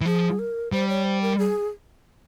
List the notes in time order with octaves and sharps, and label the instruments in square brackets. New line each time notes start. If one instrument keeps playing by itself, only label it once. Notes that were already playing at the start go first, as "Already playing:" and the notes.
[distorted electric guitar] E3
[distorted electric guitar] F3 [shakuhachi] G#4
[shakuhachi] A#4
[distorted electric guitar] G3 [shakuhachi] C5
[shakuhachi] C#5
C5
A#4
G#4